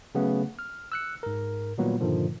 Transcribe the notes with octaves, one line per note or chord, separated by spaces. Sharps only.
C#3 F#3 A3 B3
F6
E6 F#6 C#7
G#2 A#4
A#2 D#3 F#3 G3 A#3 B3
G2 A#2 D3 D#3 F3